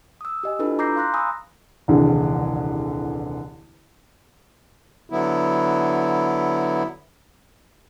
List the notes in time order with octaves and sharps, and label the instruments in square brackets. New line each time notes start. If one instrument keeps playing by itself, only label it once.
[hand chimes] D#6 E6
G4 D#5 G#5
D4 E4 F4 A4 B4 B5
A#5 D6 E6 G6 A#6 C7
F5 C6 F#6 A#6
G#5 A#5 B5 D#6 E6
[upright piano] D#1 C2 D3 E3 G#4
[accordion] D3 F#3 B3 E4